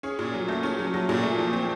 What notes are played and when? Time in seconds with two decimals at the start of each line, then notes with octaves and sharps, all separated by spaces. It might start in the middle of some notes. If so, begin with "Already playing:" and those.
0.03 C#4 G#4
0.19 A#2
0.34 F#3
0.48 A3
0.63 C#4
0.79 F#3
0.94 F#3
1.09 A#2
1.23 A3
1.38 F3
1.53 C4